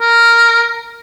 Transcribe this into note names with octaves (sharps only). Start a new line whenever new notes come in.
A#4